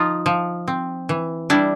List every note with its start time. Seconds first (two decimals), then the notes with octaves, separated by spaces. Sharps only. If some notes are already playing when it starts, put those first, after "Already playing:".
Already playing: F3 D#4 F4
0.26 F3
0.68 C4
1.09 E3
1.50 G3 D4 E4